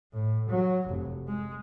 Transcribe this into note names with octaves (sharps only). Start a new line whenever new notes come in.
A2
F#3
F1
G#3